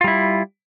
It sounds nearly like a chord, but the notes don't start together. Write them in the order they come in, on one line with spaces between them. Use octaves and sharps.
F4 G3 E4